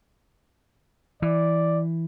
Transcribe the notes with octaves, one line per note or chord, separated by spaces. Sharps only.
E3 D5